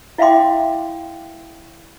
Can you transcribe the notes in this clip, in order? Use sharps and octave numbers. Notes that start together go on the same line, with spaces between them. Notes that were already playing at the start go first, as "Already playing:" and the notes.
E4 E5 F5 G5 C6 D6